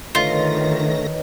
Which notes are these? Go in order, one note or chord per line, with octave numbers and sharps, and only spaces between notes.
D3 D#3 A3 F4 B4 C#5 D#5 A#6